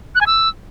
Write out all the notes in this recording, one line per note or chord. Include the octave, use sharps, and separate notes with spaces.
F#6
G#5
E6